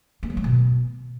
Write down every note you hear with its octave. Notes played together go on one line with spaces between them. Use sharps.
A#3
F#3
A3
B2